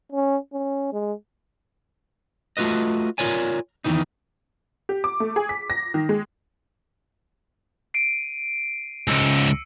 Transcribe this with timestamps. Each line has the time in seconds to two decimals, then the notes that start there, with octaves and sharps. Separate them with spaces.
0.12 C#4
0.53 C#4
0.92 G#3
2.57 A3 F4 F#4 B4 D#5
3.18 F4 A#4 C#5 D5 G#5
3.84 E2 A#2 D#3 E3 D#4
4.89 G4
5.04 D6
5.20 A3
5.36 G#4
5.49 B6
5.70 A#6
5.94 D#3
6.09 G#3
7.94 C7 D7 D#7
9.07 C#2 G#2 E6 C#7